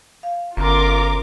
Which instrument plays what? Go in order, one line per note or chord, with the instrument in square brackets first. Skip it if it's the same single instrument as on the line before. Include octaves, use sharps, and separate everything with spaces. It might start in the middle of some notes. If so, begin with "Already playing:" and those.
[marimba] F5
[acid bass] G1 [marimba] C#4 [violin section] F4 A#4 D6